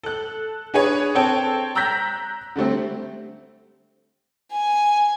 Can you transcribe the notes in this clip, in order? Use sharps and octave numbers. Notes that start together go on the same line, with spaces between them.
A4 F#6
D4 G#4 B4 C#5
C4 A4 C#5 G5 A5
A#5 E6 F#6 G6 A#6 B6
D3 G3 A3 C4
G#5